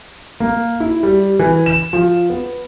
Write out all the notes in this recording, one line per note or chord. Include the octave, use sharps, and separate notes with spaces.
A#3
E4
G3
E3
E7
F3
B3